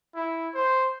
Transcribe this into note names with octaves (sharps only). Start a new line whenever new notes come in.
E4
C5